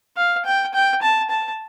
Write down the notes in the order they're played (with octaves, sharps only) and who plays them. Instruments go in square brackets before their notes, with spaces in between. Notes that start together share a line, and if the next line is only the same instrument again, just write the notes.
[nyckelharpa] F5
G5
G5
A5
A5